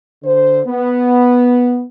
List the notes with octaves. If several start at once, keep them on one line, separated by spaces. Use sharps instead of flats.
D3 C5
B3